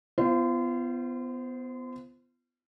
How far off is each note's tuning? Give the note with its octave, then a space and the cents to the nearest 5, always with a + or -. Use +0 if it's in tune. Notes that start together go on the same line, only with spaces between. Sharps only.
B3 +20 F4 -35 C5 -5